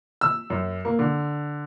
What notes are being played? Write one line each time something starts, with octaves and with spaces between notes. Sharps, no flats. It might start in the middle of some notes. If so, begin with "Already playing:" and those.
E6
F#2
A#3
D3